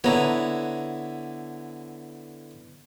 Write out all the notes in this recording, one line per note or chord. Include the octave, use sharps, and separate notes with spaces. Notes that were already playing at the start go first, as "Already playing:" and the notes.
D3 B3 E4 C#5 A#5